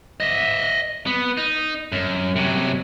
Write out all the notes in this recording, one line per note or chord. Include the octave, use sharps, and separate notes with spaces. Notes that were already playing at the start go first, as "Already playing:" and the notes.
D#5 E5
B3
D#4
F#2
C3 F#3